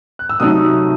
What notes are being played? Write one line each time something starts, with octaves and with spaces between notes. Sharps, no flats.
F#6
E6
C3 F#3 A3 D#4 D#6